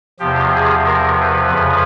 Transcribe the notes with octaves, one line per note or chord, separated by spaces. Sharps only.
E2 C3 F3 G4
G#4
A#4
B4
F2 C#3 F3